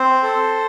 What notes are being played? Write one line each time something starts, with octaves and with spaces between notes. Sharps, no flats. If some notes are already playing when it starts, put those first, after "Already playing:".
Already playing: C4 C5
A4